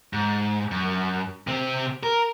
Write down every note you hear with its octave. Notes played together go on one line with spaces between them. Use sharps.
G#2
F#2
C3 C4
A#4